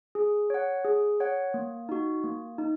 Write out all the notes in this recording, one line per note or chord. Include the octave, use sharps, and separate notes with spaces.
G#4
C#5 F#5
G#4
C#5 F#5
A#3
D#4 F#4
A#3
D#4